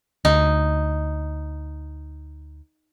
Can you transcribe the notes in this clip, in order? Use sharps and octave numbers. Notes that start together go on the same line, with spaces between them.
D2 D#4